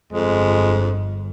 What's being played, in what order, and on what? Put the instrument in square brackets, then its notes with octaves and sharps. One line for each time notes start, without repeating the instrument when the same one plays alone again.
[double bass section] G1 [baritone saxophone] F2 [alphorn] G#3